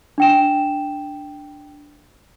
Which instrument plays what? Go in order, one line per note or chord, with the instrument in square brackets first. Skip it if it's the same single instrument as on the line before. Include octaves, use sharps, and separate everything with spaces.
[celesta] D4 G5 E7